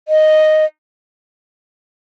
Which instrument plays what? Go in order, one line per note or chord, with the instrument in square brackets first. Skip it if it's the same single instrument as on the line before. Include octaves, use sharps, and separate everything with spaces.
[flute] D#5